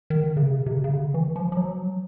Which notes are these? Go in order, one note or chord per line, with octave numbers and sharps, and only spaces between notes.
D#3
D3
C#3
C3
C3
C#3
C#3
D3
E3
F3
F3
F#3